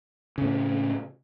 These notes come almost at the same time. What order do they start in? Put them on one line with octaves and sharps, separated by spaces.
C#3 A2 C4